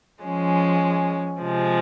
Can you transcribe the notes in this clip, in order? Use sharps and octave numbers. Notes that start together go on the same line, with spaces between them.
F3 G#3 C#4
C3 F3 G#3